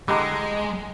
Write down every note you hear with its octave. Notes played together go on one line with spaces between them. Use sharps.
D3 E3 G#3 G4 D#5 A#5